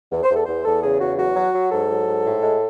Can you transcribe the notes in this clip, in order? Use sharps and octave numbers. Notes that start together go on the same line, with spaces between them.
E2
C5
E2 A4
E2 C5
E2 A4
C#3 G#4
E2 F#4
F#3 F#4
F#3
F#3
G#2 A4
F#3
G#2
A2
G#3